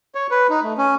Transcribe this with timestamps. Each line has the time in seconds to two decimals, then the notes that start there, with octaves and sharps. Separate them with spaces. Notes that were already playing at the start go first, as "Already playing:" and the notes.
0.15 C#5
0.31 B4
0.50 D#4
0.63 A3
0.78 C#4